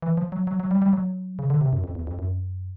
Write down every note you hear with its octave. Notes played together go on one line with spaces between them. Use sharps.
E3
F3
F#3
F#3
F#3
G3
G3
F#3
C#3
D3
C3
F#2
F2
E2
F2
F#2